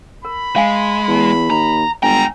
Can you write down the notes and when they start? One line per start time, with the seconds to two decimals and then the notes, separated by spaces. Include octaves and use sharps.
0.25 A#4 B5
0.56 G#3 F5 G#5
1.08 E2
1.50 D#2 A#5
2.03 G1 G#3 G5 G#5 A#5